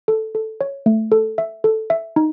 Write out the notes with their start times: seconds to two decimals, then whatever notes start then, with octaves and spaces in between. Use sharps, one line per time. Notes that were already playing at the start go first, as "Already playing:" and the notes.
0.08 A4
0.35 A4
0.61 C#5
0.86 A3
1.12 A4
1.38 E5
1.64 A4
1.90 E5
2.16 D#4